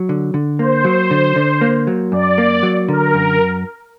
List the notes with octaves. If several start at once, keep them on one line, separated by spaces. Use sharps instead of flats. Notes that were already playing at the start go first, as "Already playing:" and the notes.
Already playing: F#3
D3
D3
A#3 C5
F#3
D3
D3
A#3
F#3
F#2 D5
A#3
F#3
D3 A#4
F#2